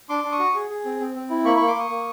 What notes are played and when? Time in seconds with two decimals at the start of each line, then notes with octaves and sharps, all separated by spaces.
0.09 D4 C6 D6
0.24 D4
0.32 C#6 D#6
0.40 F#4
0.55 G#4
0.70 G#4
0.85 C4
1.00 C4
1.15 C4
1.30 E4
1.45 A#3 B5 C#6
1.56 A#3 B5 C#6
1.67 C6 D6
1.76 A#3 C#6 D#6
1.90 A#3